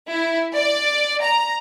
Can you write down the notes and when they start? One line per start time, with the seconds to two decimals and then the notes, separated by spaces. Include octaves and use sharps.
0.12 E4
0.55 D5
1.24 A#5